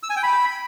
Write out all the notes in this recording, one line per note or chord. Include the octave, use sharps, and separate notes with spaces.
E6
G#5
G5
B5